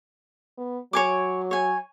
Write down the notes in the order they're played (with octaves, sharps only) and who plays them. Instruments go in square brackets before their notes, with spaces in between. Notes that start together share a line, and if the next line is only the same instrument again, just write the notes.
[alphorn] B3
[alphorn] F#3 [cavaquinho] C#5 G#5 D6
[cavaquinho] C#5 G#5